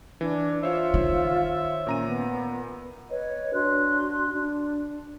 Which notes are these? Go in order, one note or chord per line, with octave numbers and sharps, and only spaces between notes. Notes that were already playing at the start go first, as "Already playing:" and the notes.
E3 D4
F4 C5 C#5 E5
D#3
A#2 C#4 A#5 D#7
B3
B4 C#5 D#5
D4 F#4 C6 F#6
D4